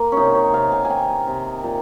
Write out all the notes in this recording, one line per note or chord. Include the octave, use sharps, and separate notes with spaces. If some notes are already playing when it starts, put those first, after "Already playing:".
Already playing: A#3 A#4
C3 C#4 D#4
C#5
C3 F5
G#5
G#5
D#3 G5
C3
A#2